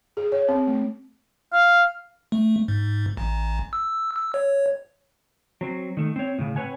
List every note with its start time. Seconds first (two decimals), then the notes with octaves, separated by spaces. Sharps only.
0.17 G#4
0.32 C#5
0.49 C4
0.67 A3
1.52 F5
2.32 A3
2.68 G#2
3.17 A1
3.73 E6
4.16 E6
4.34 C#5
5.61 F#3 C4
5.97 D#3 A3
6.16 C4 C#5
6.39 A2 C#3
6.56 C4 B4 C#5 F#5 G#5